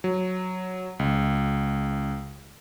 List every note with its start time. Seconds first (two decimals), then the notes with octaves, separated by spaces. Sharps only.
0.04 F#3
0.99 C#2